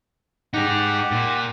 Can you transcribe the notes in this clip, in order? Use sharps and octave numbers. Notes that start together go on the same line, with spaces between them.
D#4 G4 G#4 F#5
A#2